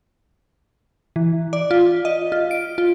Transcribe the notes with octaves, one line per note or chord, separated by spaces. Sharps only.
E3
D5
F4
D#5
F4
D7
F4